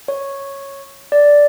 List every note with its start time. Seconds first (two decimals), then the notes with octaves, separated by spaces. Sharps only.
0.08 C#5
1.12 D5